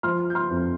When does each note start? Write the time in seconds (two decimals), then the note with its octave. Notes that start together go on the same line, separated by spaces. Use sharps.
0.03 F3 C6 F6
0.30 G6
0.35 C6 F6
0.51 F2